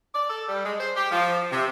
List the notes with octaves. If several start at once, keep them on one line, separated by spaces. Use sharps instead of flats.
D5
A4
G3
G#3
C5
G4
F3
C3